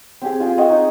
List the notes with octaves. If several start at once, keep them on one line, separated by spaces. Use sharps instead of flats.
C4 G4 G#4
F4 G#4 G5
C4 D#5 F#5 C#6
D#4